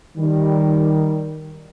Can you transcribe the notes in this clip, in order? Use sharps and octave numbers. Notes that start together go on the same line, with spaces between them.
D#3 G3